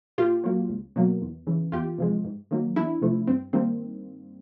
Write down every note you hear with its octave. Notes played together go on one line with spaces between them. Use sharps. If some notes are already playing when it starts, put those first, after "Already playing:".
A#2 F4 G4
F#3 A#3
C#2
B2 F#3 A#3
E2
C#3 E3
E2 F4 G4
C3 F3 G#3
G#2
D#3 F#3 A#3
E2 D4 E4
C3 F3 A3
G2 C4
D#3 G3 A#3 C4